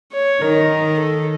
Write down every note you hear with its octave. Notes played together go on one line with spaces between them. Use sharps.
C#5
D#3 A#4
A4